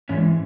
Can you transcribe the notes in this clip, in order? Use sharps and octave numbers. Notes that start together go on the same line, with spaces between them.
G#2 E3 G#3 C#4